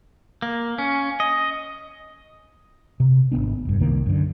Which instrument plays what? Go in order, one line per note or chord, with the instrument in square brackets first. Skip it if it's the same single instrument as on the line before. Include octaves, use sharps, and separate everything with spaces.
[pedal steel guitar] A#3
C#4
D#5
[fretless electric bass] C3
G#1 A#2 B3 D4
F1 G2
C2 D#3 A#3
F#2 D3